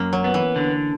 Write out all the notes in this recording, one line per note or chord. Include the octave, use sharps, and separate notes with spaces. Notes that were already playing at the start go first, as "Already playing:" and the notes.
Already playing: F#2 A#3 C#4
F#3
B3
E3
D3